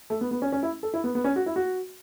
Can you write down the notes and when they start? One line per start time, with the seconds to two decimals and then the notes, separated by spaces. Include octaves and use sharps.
0.10 A3
0.21 B3
0.31 B3
0.42 C#4
0.52 C#4
0.63 E4
0.83 A4
0.94 E4
1.04 B3
1.15 B3
1.24 C#4
1.36 F#4
1.46 E4
1.56 F#4